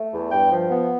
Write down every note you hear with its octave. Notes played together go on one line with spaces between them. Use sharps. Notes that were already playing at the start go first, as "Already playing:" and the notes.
Already playing: A3
E2
G2 G5
F3
B3